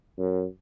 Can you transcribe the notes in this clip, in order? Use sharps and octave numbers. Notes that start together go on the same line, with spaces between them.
F#2